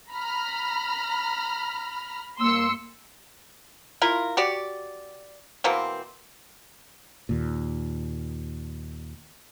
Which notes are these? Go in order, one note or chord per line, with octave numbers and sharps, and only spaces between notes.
A#5 B5 F6
G2 A#3 C6 E6 C#7
E4 F4 A#4
F#4 G4 D5
B2 E3 A#3 C4
D#2 A#2